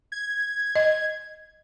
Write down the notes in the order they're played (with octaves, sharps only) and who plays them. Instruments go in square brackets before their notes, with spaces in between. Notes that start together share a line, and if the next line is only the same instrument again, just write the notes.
[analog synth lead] G#6
[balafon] D#5